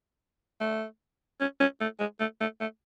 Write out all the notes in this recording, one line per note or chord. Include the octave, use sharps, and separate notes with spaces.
A3
C#4
C#4
A3
G#3
A3
A3
A3